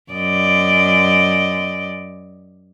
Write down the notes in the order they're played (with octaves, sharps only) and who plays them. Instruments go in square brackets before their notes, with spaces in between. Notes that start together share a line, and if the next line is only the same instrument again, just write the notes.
[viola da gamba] F#2 D5 D#5